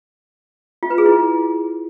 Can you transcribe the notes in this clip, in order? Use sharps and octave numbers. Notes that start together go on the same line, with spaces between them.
F4
B4
G#4
E4